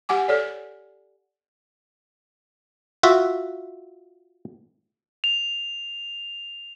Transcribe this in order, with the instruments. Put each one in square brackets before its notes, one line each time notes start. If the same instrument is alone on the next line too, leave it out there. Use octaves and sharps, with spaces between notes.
[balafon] G4 F#5 G#5 D6
A4 C#5 D5
[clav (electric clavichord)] F4 F#4 E5
[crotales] F7